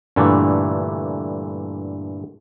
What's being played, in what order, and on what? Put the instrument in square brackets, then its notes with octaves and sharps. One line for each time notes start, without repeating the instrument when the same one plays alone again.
[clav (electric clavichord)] G2 A#2 D3 E3 A3